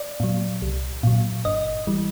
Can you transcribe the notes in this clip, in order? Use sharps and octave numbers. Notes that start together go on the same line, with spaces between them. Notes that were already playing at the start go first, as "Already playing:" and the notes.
Already playing: D5
A#2 F#3
C2
A#2 F#3
G1 D#5
E3 G3